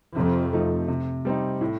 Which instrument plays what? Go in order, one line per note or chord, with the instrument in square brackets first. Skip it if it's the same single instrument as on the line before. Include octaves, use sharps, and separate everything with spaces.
[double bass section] F2 [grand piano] C3
[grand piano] F3 A3 D#4
C3
G3 C4 D#4
A2